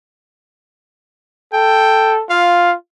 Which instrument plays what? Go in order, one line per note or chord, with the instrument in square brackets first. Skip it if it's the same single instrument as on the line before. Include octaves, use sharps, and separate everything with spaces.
[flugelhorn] A4 [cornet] G5
[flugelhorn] F4 [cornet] F5